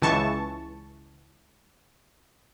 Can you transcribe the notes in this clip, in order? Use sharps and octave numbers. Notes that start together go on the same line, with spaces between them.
C#2 E3 A5 C#6